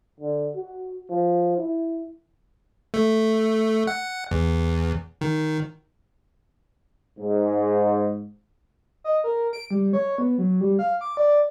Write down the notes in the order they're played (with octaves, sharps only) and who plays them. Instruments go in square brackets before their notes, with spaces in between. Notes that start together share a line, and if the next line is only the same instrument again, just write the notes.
[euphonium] D3
F#4
F3
E4
[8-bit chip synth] A3
F#5
E2
D#3
[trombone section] G#2
[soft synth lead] D#5
A#4
D7
G3
C#5
B3
F#3
G3
F5
D6
D5